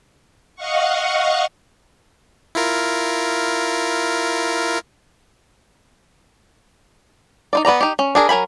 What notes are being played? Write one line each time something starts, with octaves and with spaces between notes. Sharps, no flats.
D#5 F5 F#5 C#6
E4 F4 A#4
D#4 F4 D5
B3 B4 D5 A#5
D#4 G4
C#4
D4 G#4 A#4
F#3 A#4 G#5 B5